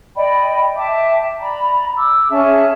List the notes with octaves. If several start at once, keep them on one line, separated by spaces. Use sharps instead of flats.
D5 D#5 G5 B5
E5 G5 A5 D6
D5 A#5 B5
D6 E6
C#4 G#4 E5 A5